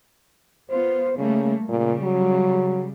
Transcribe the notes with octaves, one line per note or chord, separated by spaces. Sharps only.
B3 F4 C5
C#3 G3 A3 A#3
A#2 C#3 G3
F#3